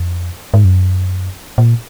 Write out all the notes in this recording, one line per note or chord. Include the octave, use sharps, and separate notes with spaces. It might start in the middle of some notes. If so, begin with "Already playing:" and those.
Already playing: F2
G#2
F#2
A#2